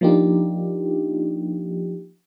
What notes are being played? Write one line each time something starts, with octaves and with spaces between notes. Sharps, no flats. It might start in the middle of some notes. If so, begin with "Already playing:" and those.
F3 A#3 D4 D#4 F4 G4